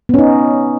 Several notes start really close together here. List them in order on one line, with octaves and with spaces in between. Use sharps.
B3 C#4 D#4